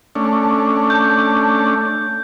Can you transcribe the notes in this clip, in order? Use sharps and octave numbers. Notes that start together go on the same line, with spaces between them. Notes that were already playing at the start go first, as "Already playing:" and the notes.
A3 C#4 D4
G6